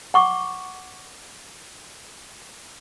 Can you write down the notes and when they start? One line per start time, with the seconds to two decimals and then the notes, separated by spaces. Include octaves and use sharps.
0.14 F#5 C#6 D6